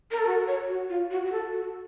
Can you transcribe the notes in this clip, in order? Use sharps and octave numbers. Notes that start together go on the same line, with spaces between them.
A#4
A4
F#4
C#5
F#4
F4
F#4
F#4
A4
F#4